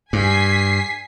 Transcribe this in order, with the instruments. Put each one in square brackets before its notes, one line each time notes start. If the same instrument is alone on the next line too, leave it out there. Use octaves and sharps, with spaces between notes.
[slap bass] G2 [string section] G#5 B6 C7